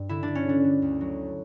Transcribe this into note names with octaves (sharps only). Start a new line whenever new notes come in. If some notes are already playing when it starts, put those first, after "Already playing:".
Already playing: G2
D3 E4
D4
D3
C#4
D3 D4
D3
D2
F#3